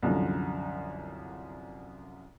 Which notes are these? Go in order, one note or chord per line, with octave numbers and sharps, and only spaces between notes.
C2 F#2 D3 F3